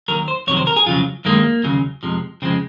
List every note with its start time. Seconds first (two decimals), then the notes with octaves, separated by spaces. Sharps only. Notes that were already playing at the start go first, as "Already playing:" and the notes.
0.08 D#2 D#3 F#3 A#4
0.28 C5
0.47 F2 C3 D#3 F#3 C#5
0.57 C5
0.67 A#4
0.76 G#4
0.86 F2 C#3 F#3 F4
1.25 F#2 D#3 G#3 A#3
1.64 D#2 C#3 F#3
2.03 F2 C3 F3 G#3
2.42 F2 C#3 F3 G#3 C4